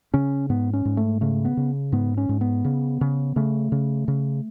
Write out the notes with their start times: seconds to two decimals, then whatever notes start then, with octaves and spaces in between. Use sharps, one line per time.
0.14 C#3 C#4
0.50 G#2 B3
0.73 C#4
0.85 G#2
0.97 A3
1.21 C#3 A3
1.45 B3
1.57 C#3
1.92 G#2 B3
2.17 C#4
2.29 G#2
2.41 B3
2.65 C#3
3.01 C#3
3.36 C#3 A3
3.72 C#3
4.08 C#3